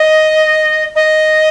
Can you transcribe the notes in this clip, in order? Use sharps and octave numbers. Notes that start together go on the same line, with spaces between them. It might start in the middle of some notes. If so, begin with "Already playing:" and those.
Already playing: D#5
D#5